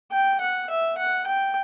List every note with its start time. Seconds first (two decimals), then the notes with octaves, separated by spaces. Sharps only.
0.12 G5
0.41 F#5
0.70 E5
0.98 F#5
1.26 G5